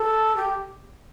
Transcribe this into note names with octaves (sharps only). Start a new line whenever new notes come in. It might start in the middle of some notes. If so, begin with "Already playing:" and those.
Already playing: A4
G4